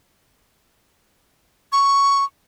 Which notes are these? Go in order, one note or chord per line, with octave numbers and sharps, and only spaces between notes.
C#6